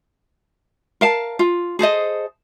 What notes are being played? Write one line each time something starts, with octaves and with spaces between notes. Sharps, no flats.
A#4 F5 A5
F4
G#4 A4 C5 D#5